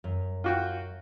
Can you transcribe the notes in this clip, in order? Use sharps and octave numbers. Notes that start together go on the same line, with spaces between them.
F#2
F4 F#4 G5